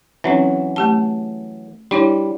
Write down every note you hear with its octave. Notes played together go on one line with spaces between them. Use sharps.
E3 F#3 C4 C#4 D#4
A3 G4 A5
G3 D4 E4 C#5